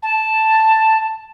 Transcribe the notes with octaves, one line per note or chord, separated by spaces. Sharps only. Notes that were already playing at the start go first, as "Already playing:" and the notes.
A5